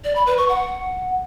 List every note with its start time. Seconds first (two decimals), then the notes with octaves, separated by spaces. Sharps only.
0.04 D5
0.15 B5
0.27 B4
0.38 C#6
0.49 F#5